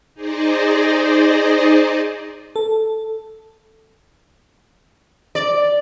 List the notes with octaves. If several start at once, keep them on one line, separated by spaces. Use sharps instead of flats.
D#4 G#4 C5 D5 D#5
A4
D5